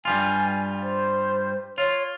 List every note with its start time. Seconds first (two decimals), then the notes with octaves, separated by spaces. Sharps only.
0.05 G2 G3 F4 G#5
0.83 C5
1.78 F4 C#5